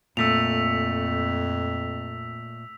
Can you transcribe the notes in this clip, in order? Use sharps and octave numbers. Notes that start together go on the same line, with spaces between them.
F2 A#2 A3 E6 B6 F7